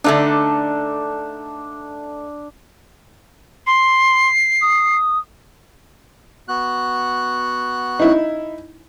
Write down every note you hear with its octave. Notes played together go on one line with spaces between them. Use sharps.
D3 A3 D4 D#4 A5
C6 C7
D#6
B3 F#4 F#6
D#4 E4